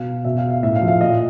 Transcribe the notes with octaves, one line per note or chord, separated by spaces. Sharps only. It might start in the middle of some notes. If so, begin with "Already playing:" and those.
Already playing: B2 F5
B2 E5
F5
F5
A2 E5
F5
F3
F5
A#2 D#5